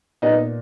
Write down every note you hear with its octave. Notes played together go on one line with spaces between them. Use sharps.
A#2 B3 D#4